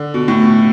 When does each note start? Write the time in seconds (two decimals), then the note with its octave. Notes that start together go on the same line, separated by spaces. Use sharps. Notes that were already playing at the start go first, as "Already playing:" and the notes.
Already playing: D3
0.14 B2
0.28 A2
0.42 B2